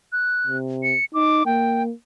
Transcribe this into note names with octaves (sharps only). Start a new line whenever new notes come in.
F#6
C3
C#7
D#4 D6
A#3 G5